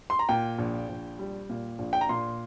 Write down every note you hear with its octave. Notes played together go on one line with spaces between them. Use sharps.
C6
A#5
A#2 G5
A#1
A#1
G3
A#2
A#1
G5
A#5
A#2 C6